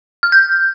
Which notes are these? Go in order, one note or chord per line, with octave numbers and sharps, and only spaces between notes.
F6
G6